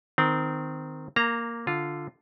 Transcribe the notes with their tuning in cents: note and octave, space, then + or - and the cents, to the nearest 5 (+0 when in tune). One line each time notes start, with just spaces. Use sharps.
D#3 -5 C4 -25
A#3 +0 A#5 -15
D3 +0 F4 +0